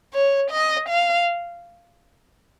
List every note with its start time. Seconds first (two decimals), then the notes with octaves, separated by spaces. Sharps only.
0.13 C#5
0.51 D#5
0.88 F5